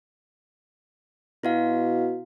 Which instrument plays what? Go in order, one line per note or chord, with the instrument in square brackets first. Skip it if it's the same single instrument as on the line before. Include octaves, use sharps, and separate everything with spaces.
[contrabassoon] B2 [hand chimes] E4 F#4 F5